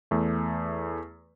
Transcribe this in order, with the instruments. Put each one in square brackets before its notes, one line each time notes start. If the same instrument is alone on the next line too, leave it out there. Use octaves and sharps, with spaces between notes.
[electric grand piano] E2 A3